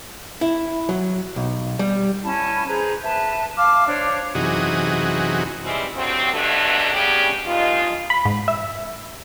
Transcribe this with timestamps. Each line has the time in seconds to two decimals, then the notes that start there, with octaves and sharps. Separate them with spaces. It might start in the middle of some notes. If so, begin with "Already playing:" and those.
0.41 E4
0.89 F#3
1.36 B1
1.79 G3
2.24 C#4 E4 A5
2.67 G#4 B4 C5 A#5
3.03 B4 E5 A5
3.58 F5 A5 D6 F6
3.87 D4 C5 C#5
4.35 F#2 C3 E3 D#4 F#4 G#4
5.64 E3 G3 G#3 C4 C#4 E4
5.95 D2 G2 F#3 C4
6.33 G2 B2 D3 F#3 A3 D4
6.93 C#3 G3 B3 C#4 D4 G4
7.46 G2 G#3 D#4 F4
8.10 B5
8.25 G#2
8.48 E5